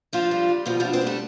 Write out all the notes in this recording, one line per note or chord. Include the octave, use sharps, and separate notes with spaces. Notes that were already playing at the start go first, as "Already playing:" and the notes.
F3 D4 F4
G3
G3
B2 F3 F4
F3 F4
D4
C4 C5
G3
A3 A4